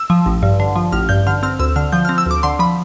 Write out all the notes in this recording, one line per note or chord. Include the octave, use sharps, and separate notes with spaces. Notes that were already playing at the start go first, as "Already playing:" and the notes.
Already playing: E6
F3
A1
G2
D3
F3
A1 F6
G2 G6
D3 F6
C4 F6
D2 E6
D3 F6
F3 G6
F6
C4
E6
D2 D6
D3 C6
F3 B5